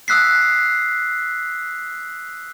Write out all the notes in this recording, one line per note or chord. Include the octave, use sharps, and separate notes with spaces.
D#6 E6 F#6 B6 C7